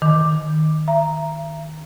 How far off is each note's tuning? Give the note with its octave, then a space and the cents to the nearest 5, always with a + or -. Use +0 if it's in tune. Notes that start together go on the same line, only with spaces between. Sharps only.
D#3 +0 D6 +10
E5 +40 A#5 +0